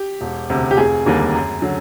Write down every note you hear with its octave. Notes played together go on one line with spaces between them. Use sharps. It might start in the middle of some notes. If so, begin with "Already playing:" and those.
Already playing: G4
E1
D2 C3
G4
F1 G#4
D#2 D3 G3 A#3
F#2
D3 F#3